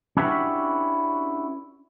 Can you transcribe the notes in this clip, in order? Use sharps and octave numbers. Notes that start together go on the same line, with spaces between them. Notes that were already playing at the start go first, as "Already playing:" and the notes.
C#4 D4 E4 F#4 G4 B4